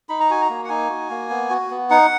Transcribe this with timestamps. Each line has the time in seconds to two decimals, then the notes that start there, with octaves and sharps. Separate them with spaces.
0.09 D#4 B5
0.20 A#5
0.30 F#4 G#5
0.42 A#5
0.50 A#3
0.65 F#5
0.69 D#4 G#5
0.90 F#4
1.10 A#3
1.30 B3
1.50 F#4
1.70 B3
1.90 D#4 F#5